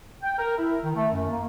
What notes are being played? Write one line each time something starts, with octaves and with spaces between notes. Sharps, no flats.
G5
A#4
E4
D#3
A3
F#2
A#3